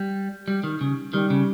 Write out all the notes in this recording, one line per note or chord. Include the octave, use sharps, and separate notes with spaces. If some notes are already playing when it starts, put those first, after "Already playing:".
Already playing: G3
G3
D#3
C#3
D#3 G3
C#3